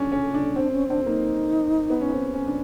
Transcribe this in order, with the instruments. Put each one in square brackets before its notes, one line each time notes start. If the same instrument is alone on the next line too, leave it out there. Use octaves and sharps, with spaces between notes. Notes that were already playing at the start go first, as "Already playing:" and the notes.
Already playing: [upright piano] C#4 D4
C#4
D4
[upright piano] C4 [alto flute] D4
[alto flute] C#4
[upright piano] C4 [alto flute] D4
[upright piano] A#3 [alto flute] D#4
[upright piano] B3
C#4
C4
C#4
D4